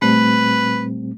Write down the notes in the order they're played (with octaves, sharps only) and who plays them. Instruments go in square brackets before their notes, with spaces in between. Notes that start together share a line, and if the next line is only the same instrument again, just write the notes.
[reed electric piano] A#2 G3 C4 [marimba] A3 [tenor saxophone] B4